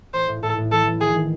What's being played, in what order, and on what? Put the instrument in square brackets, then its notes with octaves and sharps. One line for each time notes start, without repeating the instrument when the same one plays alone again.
[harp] A1 [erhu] C5
[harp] A2
[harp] A2 [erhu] A4
[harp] A2
[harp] E3 [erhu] A4
[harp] E3
[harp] D#3 [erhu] G#4
[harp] D#3